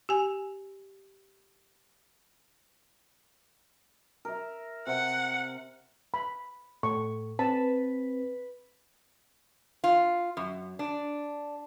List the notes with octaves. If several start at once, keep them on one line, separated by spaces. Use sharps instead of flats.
G4 G#5
A#4 E5
C3 F#5
B5
A2 C#6
C4 B4 A5
F4
F#2
D4